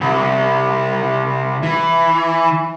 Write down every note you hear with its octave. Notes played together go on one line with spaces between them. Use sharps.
C2
E3